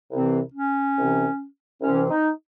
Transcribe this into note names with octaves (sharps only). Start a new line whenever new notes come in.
C2 C3 E3 C4
C#4
C2 C3 E3 C4
C2 C3 E3 C4 C#4
D#4